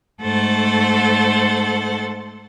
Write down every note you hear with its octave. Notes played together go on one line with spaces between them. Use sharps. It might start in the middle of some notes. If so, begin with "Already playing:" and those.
G#2 A3 A4 C5 F#5 A6